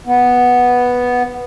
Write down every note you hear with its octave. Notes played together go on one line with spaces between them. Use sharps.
B3